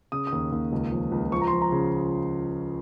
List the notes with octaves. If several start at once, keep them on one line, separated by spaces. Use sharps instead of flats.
C#3 D#6
D#6
D#2
D#2
C#2
F3
C#2
F3 C#6
A#5
C6
F3
A#5
C#3